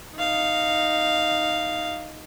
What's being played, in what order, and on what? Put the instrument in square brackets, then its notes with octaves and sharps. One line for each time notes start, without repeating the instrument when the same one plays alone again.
[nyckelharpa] D#4 F5